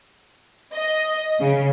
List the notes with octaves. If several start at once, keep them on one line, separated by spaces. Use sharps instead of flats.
D#5
C#3